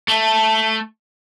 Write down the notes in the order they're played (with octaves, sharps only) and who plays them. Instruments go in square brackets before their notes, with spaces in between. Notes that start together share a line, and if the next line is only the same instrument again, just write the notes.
[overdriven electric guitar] A3